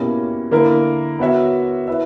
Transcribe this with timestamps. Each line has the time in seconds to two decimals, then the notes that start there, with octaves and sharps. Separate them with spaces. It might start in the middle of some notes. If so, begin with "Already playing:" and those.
Already playing: B2 A#3 C#4 E4 G4
0.51 D3 A#3 E4 A#4
1.19 B3 F#4 C#5 E5
1.88 E4 B4 E5